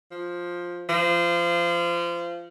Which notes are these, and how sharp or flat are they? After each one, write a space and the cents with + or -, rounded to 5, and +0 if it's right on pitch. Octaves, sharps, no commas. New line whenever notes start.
F3 +10
F3 -25